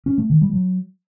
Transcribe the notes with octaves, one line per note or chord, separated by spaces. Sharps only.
C#4
A3
D#3
G3
F#3